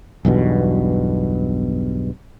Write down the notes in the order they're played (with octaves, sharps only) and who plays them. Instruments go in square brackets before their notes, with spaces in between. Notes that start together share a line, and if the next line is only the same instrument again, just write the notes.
[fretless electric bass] B1 E2 G2 B2